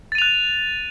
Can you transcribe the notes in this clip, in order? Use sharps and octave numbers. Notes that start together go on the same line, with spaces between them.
F#6 A6 D#7 F7